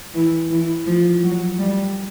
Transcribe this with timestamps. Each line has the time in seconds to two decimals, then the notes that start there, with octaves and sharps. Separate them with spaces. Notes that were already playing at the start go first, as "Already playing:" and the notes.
0.14 E3
0.50 E3
0.86 F3
1.23 F#3
1.58 G3